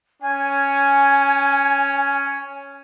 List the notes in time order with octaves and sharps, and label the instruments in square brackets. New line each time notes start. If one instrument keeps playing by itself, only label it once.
[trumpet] C#4 [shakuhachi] G#5